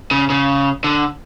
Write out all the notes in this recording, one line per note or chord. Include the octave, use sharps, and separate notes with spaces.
C#3
C#3
D3